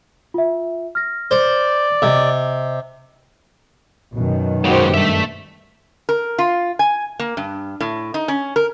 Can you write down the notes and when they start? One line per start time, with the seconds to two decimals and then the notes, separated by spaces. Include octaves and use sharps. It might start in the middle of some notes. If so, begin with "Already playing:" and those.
0.34 F4 E5
0.95 F6 A#6
1.31 C5 D5
2.02 C3 D#5
4.16 F#2 B2 D#3
4.64 G#2 C#3 F#4 G4 C5
4.94 G2 A3 E5 B6
6.09 A#4
6.38 F4
6.79 G#5
7.20 A#3
7.37 G2
7.80 A2
8.14 D#4
8.28 C#4
8.56 A#4